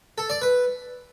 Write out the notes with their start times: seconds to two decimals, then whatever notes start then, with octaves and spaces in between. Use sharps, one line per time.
0.18 A4
0.30 D5
0.42 B4